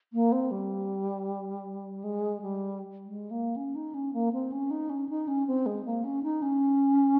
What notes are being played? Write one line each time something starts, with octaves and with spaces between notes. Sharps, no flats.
A#3
C4
G3
G#3
G3
G#3
A#3
C#4
D#4
C#4
A#3
C4
C#4
D#4
C#4
D#4
C#4
C4
G#3
A#3
C#4
D#4
C#4